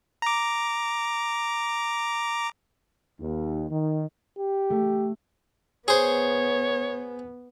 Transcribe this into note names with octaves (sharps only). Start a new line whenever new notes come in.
A#5 D6
D#2
D#3
G4
A3
B3 G#4 C5 C#5